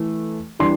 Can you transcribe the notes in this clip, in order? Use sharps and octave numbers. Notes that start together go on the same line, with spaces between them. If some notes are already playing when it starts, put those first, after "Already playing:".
Already playing: E3 A3
E3 G3 D4 C6